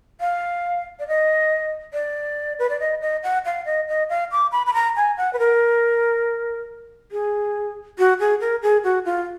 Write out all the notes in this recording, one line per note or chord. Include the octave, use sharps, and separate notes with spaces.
F5
D5
D#5
D5
B4
D5
D#5
D#5
F#5
F5
D#5
D#5
F5
D6
B5
B5
A#5
G#5
F#5
B4
A#4
G#4
F#4
G#4
A#4
G#4
F#4
F4